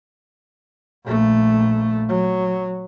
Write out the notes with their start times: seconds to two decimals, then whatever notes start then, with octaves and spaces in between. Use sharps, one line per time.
1.05 A#1 A3
2.09 F#3